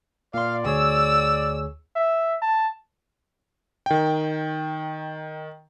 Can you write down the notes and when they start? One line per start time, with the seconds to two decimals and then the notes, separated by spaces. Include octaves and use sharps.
0.34 A#2 D5 F5 C6
0.65 D2 G#4 C#5 E6
1.96 E5
2.42 A5
3.86 D#3 G5